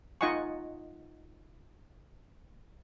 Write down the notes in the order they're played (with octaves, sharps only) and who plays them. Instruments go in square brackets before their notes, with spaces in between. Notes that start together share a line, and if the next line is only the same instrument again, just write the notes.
[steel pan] D#4 F4 D#5 F#5 G#5 C#6